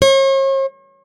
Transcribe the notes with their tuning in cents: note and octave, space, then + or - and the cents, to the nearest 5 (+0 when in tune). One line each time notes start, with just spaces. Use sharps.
C#5 -45